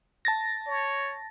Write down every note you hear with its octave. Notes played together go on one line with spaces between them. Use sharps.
A5 A6 A#6
C#5